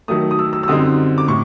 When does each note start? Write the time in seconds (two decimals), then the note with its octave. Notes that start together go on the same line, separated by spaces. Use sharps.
0.08 D#3 F#3 A3 D#6
0.31 D#6
0.39 E6
0.53 E6
0.63 E6
0.68 F#2 D3 G3 C4 D#4 D#6
1.18 D6
1.28 A2 C#6